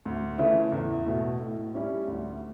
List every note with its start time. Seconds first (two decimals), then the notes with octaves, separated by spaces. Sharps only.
0.05 D2
0.38 C#3 E3 A3 E4
0.72 E2
1.06 B2 A3
1.40 A2
1.74 G3 C#4 E4
2.08 D2